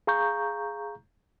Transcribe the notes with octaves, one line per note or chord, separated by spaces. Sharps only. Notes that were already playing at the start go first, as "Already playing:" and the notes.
G#4 F5 A#5 C#6 G6